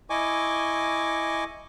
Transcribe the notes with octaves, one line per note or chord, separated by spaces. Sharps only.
E4 D#5 G#5 C#6 D6